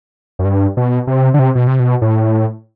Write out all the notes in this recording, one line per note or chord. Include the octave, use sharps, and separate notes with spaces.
F#2
G2
B2
C3
D3
C3
B2
C3
B2
A2